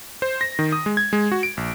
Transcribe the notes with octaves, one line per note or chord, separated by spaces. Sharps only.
C5
A#6
D#3
D#6
G#3
G#6
G#3
F#4
D7
A#1